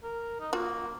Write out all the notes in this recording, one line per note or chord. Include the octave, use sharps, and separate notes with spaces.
A#4
D#4
A#3 F4 F#4